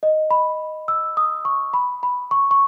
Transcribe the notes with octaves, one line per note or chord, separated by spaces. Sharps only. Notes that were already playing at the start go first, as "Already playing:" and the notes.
D#5
B5
E6
D#6
C#6
B5
B5
C#6
C#6